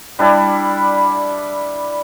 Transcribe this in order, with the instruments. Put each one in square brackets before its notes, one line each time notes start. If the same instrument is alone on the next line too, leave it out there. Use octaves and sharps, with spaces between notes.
[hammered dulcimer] G3 D4 E4 D5